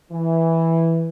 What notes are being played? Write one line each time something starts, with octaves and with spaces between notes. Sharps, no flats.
E3